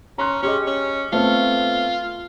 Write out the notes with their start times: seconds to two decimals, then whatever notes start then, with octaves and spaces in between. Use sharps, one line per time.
0.18 C#4 A#5 C6 F#6
0.43 C#4 G4 G#4 D#5
0.67 C#4
1.12 A3 B3 C4 F4